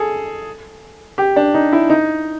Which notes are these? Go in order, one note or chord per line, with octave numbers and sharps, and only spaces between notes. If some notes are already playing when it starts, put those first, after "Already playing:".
Already playing: G#4 A4
G4
D4
D#4
E4
D#4